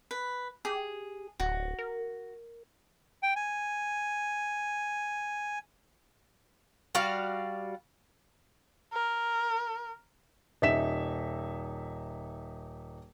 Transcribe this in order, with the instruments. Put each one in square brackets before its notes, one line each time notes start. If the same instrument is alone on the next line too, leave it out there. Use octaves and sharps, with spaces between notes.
[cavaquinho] B4
[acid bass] G4 [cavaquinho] G#4
[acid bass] D1 [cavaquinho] F#4
[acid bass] A#4
[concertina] G5
G#5
[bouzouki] G3 F#4 D5 F5
[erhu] A#4
[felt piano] D#1 D#4 E5 B6 E7